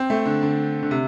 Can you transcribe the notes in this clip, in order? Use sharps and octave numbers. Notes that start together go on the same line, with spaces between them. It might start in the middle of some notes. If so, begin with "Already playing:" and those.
Already playing: C4
A3
D3
D3
D3
C3